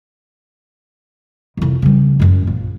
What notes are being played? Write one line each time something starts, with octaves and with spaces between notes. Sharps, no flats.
C2 F2
C#3 G3
F#2 G#3
A#1